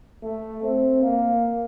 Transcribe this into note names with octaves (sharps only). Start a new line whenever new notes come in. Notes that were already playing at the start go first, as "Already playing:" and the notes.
A3
C4
A#3